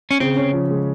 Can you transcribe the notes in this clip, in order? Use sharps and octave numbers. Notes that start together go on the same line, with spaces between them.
C#4
C#3 C4
C#4
F3
G#3